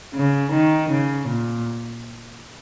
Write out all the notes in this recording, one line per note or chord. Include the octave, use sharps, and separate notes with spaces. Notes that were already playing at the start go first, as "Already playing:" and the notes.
C#3
D#3
C#3
A#2